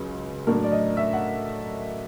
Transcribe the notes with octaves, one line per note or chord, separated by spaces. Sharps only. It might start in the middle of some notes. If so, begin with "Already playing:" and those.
Already playing: C#2 C#3 F#3
A2 F#3 A3 D4 A#4
D5
D#5
E5
F#5